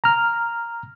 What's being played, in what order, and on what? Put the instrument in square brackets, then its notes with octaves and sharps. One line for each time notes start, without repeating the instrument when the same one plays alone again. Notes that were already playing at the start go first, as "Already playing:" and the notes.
[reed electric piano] A#5 F6